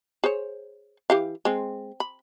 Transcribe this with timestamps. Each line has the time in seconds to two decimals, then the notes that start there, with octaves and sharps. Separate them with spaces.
0.24 G#4 C5 C#5
1.10 E3 G4 F5
1.45 G#3 C4
2.00 B5